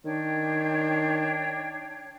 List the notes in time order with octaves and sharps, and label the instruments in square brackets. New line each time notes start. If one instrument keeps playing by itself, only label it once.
[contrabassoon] D#3 [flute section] D4 C#5 G5